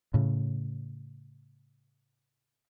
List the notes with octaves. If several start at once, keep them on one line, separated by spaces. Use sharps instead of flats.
A2 C#3